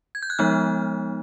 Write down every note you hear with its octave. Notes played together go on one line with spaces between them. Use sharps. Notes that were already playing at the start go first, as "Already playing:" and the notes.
G#6
G6
F#6
F3 G#3 B3 D#4 F6